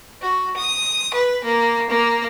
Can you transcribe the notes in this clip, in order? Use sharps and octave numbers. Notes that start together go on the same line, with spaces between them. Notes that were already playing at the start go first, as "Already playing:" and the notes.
F#4
D#6
B4
A#3
A#3